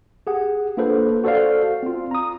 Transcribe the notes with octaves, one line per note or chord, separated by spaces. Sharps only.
G4 G#4 F#5
A#3 D4 F4 A4 B4 C5
F#4 A4 C5 D5 F5
C4 F4
A#5 D#6